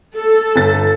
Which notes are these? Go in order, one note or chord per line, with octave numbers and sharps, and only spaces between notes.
A4
G1 A6